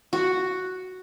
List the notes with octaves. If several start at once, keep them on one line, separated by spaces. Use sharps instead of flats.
F#4